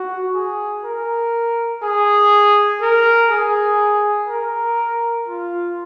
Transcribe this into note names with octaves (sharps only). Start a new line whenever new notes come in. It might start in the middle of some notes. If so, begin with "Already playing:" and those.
Already playing: F#4
G#4
A#4
G#4
A#4
G#4
A#4
F4